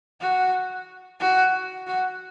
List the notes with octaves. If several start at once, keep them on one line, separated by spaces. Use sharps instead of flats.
F#4
F#4
F#4